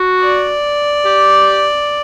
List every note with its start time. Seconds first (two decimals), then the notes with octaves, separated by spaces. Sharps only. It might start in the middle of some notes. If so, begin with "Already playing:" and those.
Already playing: F#4
0.22 D5
1.05 G4